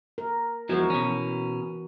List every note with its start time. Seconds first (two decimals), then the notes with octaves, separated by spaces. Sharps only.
0.18 A#4
0.69 E2 F3 G#3 F#4 A#4
0.90 B2 E3 C#4